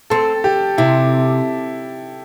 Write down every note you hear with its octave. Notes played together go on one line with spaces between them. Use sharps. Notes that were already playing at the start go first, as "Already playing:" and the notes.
C4 A4
G4
C3 E4